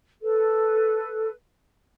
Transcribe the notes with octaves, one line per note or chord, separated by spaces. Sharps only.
A4 B4